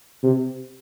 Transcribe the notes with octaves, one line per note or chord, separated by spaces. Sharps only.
C3